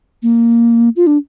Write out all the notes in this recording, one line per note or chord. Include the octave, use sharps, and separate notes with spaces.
A#3
F4
D4